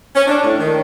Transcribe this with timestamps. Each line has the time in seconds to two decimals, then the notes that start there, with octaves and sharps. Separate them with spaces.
0.15 C#4
0.28 D4
0.43 A2
0.59 D#3